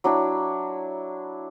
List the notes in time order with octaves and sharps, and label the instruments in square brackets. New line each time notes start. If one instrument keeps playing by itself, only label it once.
[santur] F#3 D4 E4